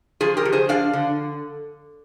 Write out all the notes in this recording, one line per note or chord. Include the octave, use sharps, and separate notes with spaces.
F3 F4 G#4
G4 A#4
F3
G#4 C5
D4 D5 F5
D3